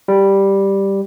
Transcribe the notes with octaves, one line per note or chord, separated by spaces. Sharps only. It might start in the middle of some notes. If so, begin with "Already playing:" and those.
G3